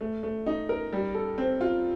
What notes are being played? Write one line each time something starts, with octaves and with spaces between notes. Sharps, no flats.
A3
A3
D#4
A#4
G3
A4
C4
F4